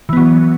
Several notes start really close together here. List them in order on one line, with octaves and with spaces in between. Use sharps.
E3 B3 F#3